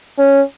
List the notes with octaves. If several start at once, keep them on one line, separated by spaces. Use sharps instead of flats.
C#4